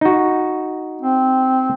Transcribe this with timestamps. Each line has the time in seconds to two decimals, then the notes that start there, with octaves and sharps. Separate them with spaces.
0.01 D#4 F#4
1.01 C4